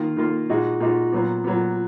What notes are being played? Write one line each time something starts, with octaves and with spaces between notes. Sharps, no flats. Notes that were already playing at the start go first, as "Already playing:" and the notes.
Already playing: D#3 A#3 F4
D#3 A#3 F4
A#2 G#3 D#4 F#4
A#2 G#3 D#4 F#4
A#2 F#3 B3
A#2 F#3 B3